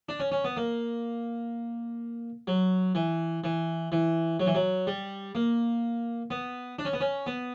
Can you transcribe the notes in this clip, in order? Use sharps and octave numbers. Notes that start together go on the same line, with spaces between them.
D4
C#4
C#4
B3
A#3
F#3
E3
E3
E3
F#3
E3
F#3
G3
A#3
B3
D4
C#4
B3
C#4
B3